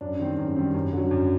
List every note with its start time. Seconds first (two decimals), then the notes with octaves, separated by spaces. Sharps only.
0.01 F#2 D4
0.19 D#3 G3 C4
0.38 F#2
0.56 D#3 G3 C4
0.74 F#2
0.93 D3 F#3
1.11 F#2